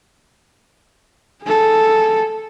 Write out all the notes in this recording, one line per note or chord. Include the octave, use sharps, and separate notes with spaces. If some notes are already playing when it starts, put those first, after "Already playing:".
G#4 A4